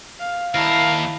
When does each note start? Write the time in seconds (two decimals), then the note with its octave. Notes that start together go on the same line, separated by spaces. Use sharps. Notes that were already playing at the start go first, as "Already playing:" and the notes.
0.19 F5
0.54 D#2 E4 A#4 F5 A5